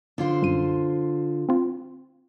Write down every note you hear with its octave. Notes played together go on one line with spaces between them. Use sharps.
D3 F4 C5
C2 F#2 D#7
C4 F4